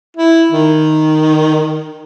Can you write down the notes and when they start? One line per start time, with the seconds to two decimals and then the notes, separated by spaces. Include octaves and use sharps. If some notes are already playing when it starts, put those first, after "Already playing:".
0.17 E4
0.52 D#3